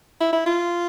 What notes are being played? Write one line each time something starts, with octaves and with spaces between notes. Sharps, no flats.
E4
E4
F4